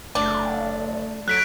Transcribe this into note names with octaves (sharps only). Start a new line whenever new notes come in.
F#1 A3 D4
F#3 A4 F#6 B6 D7